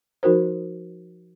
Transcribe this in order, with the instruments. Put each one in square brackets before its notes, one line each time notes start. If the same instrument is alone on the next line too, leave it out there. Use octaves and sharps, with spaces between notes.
[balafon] F3 D#4 F#4 A#4 C5